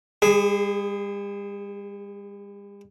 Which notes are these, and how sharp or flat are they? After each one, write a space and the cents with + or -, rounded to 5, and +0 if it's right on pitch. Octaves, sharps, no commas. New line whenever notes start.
G3 +45 G#4 +0